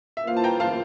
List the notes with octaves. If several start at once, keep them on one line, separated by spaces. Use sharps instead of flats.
E5
E3 A#3 F4 C5 F5
A5
G5 A#5
F5 A5